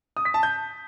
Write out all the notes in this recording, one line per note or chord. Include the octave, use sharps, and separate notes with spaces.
D#6
B6
A5
G6